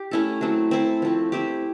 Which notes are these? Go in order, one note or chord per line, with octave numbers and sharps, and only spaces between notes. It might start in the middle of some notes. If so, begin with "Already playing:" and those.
Already playing: G4
A3 C#4 E4 A4
F#3 A3 C4
C4 E4 A4 C5
F3 A3 C4
C4 E4 G4